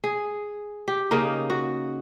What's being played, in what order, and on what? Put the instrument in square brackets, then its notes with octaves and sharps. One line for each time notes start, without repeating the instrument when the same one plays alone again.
[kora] G#4
G4
C#3 A#3 D#4
F#4